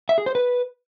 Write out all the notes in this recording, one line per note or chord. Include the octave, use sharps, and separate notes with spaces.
E5
G#4
C5
B4